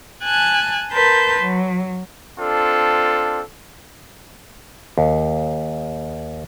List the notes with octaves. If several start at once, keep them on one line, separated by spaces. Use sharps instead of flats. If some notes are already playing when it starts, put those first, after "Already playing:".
G#5 A5 F#6 G#6
A#4 B4 A5 C6 G6
F#3
C4 D4 F4 A4
D#2